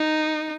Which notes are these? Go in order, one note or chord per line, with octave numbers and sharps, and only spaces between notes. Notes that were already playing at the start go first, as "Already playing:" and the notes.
Already playing: D#4